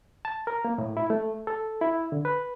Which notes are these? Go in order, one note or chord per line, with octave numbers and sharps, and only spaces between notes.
A5
A#4
A#3
A2
E4
A3
A4
E4
D3
B4